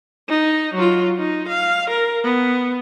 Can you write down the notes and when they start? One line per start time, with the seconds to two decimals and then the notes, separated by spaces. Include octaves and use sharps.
0.28 D#4
0.74 F#3 F4
1.18 D#4
1.49 F5
1.90 A#4
2.24 B3